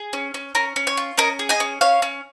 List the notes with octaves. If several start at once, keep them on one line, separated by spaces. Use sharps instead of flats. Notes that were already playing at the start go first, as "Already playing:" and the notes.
Already playing: G#4
C#4
C#4
C#4 A#4
C#4
C#5
F4
C#4 A#4 D#5
G#4
D#5 G#5
C#4
C#4 C#5 F5
C#4